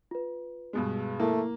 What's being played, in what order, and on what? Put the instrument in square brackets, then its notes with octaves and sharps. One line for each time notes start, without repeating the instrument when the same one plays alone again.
[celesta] F4 B4
[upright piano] G2 B2 G#3
[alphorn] A3 [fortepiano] A#3 [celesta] E4